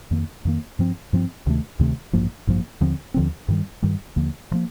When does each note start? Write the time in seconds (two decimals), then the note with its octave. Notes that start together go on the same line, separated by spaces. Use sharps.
0.11 F2 D#3 A#3
0.45 F2 D#3 A#3
0.79 G2 F3 C4
1.13 G2 F3 C4
1.46 D2 C3 D#3 A3
1.79 D2 C3 D#3 A3
2.13 A1 G2 F3 A#3
2.47 A1 G2 F3 A#3
2.81 D#2 D3 F3 C4
3.14 D#2 D3 F3 C4
3.48 G2 D#3 G3
3.82 G2 D#3 G3
4.16 D#2 D3 F3 A#3
4.51 D3 F3 A#3